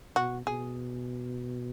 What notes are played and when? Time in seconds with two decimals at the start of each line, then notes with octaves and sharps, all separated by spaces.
0.16 B2 F#4
0.46 B2 G#4